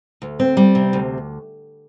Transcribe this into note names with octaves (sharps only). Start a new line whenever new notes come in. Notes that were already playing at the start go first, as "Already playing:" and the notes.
D2
C4
G3
C3
D2